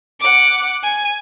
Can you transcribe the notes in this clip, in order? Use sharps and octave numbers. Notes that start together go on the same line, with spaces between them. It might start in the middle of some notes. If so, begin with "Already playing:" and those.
F#5 D6
G#5